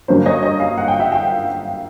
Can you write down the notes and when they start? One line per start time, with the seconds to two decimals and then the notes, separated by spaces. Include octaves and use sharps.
0.08 G2 D3 F#3 A#3 C#4 A#4 C5
0.26 C#5 D#5
0.43 C#5 D#5
0.60 D#5 F5
0.78 F#5
0.88 G5
1.00 E5 F#5
1.12 F5 G5